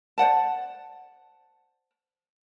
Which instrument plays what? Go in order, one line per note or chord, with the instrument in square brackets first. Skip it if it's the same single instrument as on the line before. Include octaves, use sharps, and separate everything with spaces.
[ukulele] C5 D5 F#5 A5